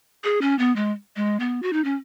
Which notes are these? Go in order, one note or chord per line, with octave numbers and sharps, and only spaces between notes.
G#4
C#4
B3
G#3
G#3
B3
F#4
D#4
C#4